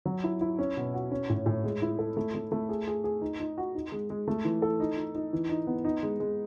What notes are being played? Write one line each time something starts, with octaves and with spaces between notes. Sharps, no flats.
F#3
E4
E4
C#4
B2
F#4
C#4
A2
A2
G#3
E4
A4
A3
A3
A3
G#4
G#4
G#4
D#4
D#4
F#4
D#4
G#3
G#3
A3
E3
A4
D#4
D#4
D#4
E3
D#4
B3
D#4
G#3
G#3